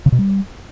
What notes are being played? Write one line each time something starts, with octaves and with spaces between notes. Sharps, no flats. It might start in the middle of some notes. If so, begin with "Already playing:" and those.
C#3
B2
G3